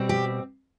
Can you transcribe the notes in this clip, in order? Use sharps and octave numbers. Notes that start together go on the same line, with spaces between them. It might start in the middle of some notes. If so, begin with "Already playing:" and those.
Already playing: B2 G3 C4
G4